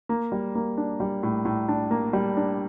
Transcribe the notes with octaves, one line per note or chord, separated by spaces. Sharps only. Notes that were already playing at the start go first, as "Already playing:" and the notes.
A#3
G3
A#3
D4
G3
A2
A2
D4
A#3
G3
D4